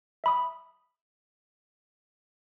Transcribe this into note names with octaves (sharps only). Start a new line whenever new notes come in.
E5 B5 D#6